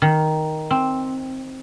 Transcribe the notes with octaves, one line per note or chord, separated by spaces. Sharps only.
D#3
C4